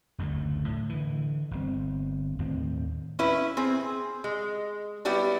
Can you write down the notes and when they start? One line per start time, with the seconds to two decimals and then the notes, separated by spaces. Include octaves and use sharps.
0.18 F#1 D2 A2 D3
0.68 A2
0.89 D3 E3
1.51 G1 D3 C4
2.39 D#2 A2 D#3 C4
3.19 C#4 E4 B4
3.57 C4 G#4
4.24 G#3
5.05 F#3 G3 B3 E4 G4